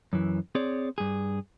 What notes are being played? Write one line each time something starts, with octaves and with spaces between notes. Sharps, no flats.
F#2 E3
C4 G#4 C#5 D5
G2 G#4